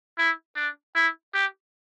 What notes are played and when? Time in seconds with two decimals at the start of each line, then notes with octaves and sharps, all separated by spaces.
0.18 E4
0.56 D4
0.95 E4
1.33 G4